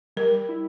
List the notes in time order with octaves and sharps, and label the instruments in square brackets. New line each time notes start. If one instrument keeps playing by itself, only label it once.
[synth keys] G3 [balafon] A#4
[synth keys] E4